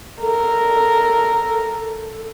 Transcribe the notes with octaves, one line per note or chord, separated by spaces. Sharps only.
A4 A#4